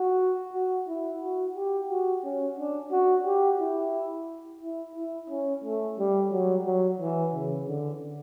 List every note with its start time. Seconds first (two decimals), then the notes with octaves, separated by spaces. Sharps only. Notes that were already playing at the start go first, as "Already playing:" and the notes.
Already playing: F#4
0.54 F#4
0.88 E4
1.22 F#4
1.56 G4
1.89 F#4
2.24 C#4
2.58 D4
2.92 F#4
3.26 G4
3.60 E4
4.61 E4
4.96 E4
5.30 C#4
5.64 A3
5.99 G3
6.32 F#3
6.66 F#3
7.01 E3
7.34 C#3
7.68 D3